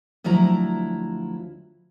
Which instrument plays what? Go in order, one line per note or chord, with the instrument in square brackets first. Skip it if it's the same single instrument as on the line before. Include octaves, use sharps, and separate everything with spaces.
[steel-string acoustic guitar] D2 F3 F#3 E4 A#5